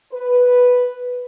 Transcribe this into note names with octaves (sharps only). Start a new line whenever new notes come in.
B4